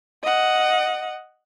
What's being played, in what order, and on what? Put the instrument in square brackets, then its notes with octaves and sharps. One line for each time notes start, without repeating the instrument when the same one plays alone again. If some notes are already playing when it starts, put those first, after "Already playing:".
[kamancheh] D#5 F#5